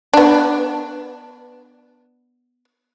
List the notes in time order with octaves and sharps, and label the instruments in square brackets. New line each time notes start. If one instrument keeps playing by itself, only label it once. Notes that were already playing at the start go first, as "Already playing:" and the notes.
[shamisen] B3 D4